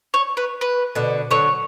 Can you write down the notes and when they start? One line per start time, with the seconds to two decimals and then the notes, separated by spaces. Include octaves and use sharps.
0.14 C#5
0.37 B4
0.61 B4
0.95 B2 D3
1.31 D3 F#3 C#5